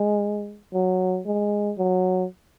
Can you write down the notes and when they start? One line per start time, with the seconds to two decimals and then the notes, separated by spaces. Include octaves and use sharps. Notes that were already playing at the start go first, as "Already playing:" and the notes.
Already playing: G#3
0.73 F#3
1.26 G#3
1.78 F#3